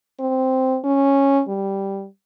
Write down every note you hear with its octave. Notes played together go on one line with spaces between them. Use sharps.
C4
C#4
G3